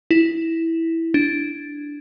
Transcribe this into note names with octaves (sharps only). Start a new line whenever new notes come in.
E4
D4